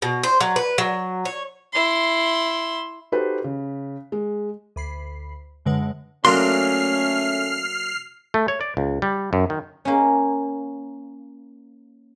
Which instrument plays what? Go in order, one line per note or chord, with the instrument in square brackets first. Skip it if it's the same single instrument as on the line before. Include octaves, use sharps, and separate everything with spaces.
[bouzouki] B2
C5
F#3
B4
F#3
C#5
[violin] E4 C6
[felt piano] D#4 F#4 G4 A4 B4 C5
C#3
G#3
[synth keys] D2 B5 C7
F#2 D3 G#3 B4 F#5
[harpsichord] F#3 A#3 D4 [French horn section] A3 C#4 [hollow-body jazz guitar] C6 [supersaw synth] F6 C7
[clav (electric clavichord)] A3
C#5
D5
C#2
G3
F#2
D#3
[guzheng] A#3 C#4